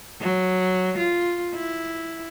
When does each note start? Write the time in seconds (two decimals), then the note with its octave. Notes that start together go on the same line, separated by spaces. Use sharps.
0.21 F#3
0.98 F4
1.54 E4